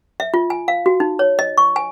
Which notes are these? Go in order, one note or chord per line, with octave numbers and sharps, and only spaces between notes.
E5
F4
G#5
F5
F#4
D#4
C#5
D#5
C#6
G#5